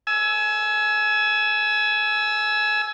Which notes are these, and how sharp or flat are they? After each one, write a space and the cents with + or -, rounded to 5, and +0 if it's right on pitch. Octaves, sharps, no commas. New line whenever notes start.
G#5 +30 E6 +0